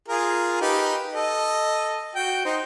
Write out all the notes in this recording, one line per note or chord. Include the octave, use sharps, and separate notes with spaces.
F4 G#4 A#4
D#4 G4 B4
A4 D#5
F#4 G5
D#4 C5